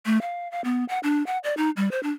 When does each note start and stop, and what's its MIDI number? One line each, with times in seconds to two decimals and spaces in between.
0.06 0.21 57
0.22 0.50 77
0.51 0.61 77
0.64 0.84 59
0.89 0.99 78
1.03 1.25 62
1.27 1.38 78
1.44 1.54 74
1.57 1.70 63
1.77 1.91 55
1.91 2.02 72
2.03 2.11 62